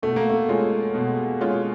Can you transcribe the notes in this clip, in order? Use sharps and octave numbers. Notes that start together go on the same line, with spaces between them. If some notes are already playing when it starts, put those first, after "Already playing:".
B2 A3
A#3
A3
G#3 C#4 F4
B2
G#3 C#4 F4